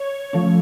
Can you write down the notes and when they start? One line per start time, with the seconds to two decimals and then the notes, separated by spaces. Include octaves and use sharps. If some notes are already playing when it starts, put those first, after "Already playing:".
Already playing: C#5
0.33 F3 A3 C#4